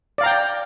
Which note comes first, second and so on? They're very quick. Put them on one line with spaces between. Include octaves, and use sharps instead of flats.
D5 F5 A#5 G5